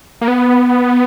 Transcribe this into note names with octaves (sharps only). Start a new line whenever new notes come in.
A#3
B3